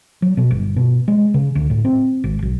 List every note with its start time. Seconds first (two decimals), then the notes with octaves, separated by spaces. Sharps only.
0.22 F#3
0.37 B2
0.51 G1
0.76 B2
1.08 G#3
1.34 C#3
1.55 D2
1.70 A2
1.85 C4
2.24 G#1
2.43 B1